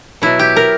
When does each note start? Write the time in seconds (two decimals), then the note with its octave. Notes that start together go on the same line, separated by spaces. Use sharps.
0.22 B2 F#3 E4
0.39 G4
0.56 A#4